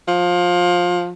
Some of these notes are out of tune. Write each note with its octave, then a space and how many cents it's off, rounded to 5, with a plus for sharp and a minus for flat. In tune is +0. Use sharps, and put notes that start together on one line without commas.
F3 +20